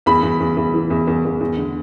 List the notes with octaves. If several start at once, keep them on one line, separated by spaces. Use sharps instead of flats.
E2 B5
E2
E2
E2
E3
E2
E2
E2
E2
D3